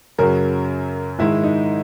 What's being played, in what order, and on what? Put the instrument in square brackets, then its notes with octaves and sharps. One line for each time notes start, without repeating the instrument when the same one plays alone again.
[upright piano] F#2 C#3 F#3 A#4
G#2 D#3 G#3 E4
D#4